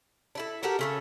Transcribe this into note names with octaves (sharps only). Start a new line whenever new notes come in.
D4 E4 A4
F#4 G4 A4 A#4
C#3 A3 C#4